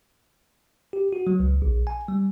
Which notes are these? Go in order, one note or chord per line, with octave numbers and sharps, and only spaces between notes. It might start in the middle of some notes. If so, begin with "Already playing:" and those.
G4
F#4
F#3
C#2
A#1
G#5
G3